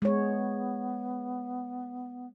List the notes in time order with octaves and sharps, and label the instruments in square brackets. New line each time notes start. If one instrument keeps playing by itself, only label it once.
[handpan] G#3 C#5 [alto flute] B3